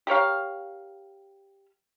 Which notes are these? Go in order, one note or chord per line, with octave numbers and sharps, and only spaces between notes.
G4 A#4 C#5 F5